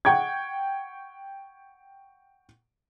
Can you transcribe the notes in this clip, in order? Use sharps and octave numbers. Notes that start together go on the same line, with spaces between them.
F#5 G5 C#6 G#6